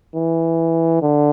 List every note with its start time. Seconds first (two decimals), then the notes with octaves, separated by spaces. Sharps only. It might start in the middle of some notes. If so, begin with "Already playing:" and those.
0.15 E3
1.02 D3